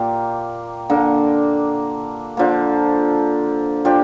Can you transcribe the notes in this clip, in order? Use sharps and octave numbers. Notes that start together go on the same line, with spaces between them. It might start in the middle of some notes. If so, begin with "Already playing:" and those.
Already playing: A#2 A#3 G4
D3 A#3 D4
D3 F3 A#3
F3 D4 G4